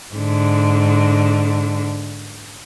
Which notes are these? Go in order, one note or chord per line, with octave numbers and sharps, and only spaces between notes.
G#2 D3